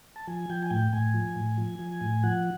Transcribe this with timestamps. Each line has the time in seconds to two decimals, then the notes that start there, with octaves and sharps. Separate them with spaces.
0.16 A5
0.27 F3 G#5
0.50 F3 G5
0.63 G#5
0.70 A2 G5
0.93 A2 G#5
1.14 F3
1.36 A2
1.58 F3
1.79 F3
2.01 A2
2.23 F3 F#5